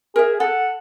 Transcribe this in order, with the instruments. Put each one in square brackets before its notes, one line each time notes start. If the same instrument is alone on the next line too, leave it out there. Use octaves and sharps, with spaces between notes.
[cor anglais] G#4 [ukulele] A#4 E5
[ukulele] A4 [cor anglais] F#5